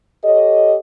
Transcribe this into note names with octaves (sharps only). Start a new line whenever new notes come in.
G4 A4 C#5 D#5